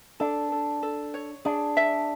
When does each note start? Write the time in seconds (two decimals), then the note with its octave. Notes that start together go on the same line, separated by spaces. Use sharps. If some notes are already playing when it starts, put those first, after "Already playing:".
0.20 D4 A4
0.52 A4
0.83 A4
1.14 C#5
1.45 D4 G#4
1.77 E5